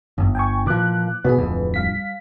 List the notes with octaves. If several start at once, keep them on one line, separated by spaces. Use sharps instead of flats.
G1 F#2
G5 G#5 C#6
A#2 E3 F3 D6 F#6
B2 B3 G#4 B4
D1 F2
G3 F5 B6